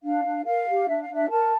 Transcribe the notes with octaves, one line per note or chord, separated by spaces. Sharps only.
D4 F5
D4
A#4 F5
G4
D4 E5
F5
D4 E5
A#4 A5